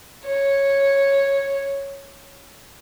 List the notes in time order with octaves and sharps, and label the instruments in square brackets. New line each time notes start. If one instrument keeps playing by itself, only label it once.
[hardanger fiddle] C#5